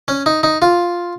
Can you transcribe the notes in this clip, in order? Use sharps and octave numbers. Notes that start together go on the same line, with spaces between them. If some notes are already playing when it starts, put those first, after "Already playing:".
C#4
D#4
D#4
F4